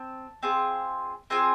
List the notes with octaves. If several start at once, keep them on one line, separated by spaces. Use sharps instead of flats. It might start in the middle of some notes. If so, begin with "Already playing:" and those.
Already playing: C4 A5
C4 F4 G#4
C4 F4 G#4 G#5